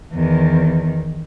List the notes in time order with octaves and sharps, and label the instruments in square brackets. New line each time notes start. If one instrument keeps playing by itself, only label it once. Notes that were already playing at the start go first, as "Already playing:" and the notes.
[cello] E2 D#3